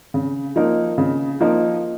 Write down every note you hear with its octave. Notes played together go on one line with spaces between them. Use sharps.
C#3
F3 A#3 D#4 A#4
C#3
F3 A#3 D#4 A#4